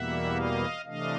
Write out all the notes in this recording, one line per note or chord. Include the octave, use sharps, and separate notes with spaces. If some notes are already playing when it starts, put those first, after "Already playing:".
Already playing: E2 B2 G3 A#3 E5 F#5
D#5 F5
C3 E3 A3 D4 D#5 F5